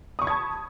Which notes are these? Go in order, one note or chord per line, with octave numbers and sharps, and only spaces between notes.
A5 B5 C#6 D#6 G#6